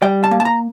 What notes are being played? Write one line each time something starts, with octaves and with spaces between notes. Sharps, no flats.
G3 G5
A5
A#3
A5
A#5